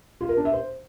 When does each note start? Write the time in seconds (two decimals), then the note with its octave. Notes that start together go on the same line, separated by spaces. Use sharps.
0.21 F4
0.29 A#4
0.37 D4
0.45 E5
0.53 C5